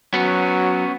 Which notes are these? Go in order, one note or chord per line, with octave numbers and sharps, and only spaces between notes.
F#3 B3 C#4